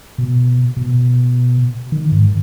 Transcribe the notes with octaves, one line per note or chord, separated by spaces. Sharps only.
B2
B2
D#3
G#2